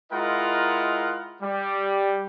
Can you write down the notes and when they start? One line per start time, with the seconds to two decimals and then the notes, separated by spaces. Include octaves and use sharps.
0.12 G#3 E4 F4 A#4 D#5 F#5
1.41 G3